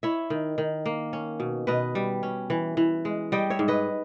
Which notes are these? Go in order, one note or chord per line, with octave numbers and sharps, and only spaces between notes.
E4 C#5 E5
D#3
D#3
A#3
C#4
B2
B2 B4 D#5
G3
C#4
E3
E3
G#3
G3 D#5 G5
C#5 E5
G#2
B4 D#5